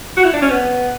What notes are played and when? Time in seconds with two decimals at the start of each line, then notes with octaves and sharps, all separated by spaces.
0.17 F#4
0.24 E4
0.34 D4
0.42 C#4
0.50 B3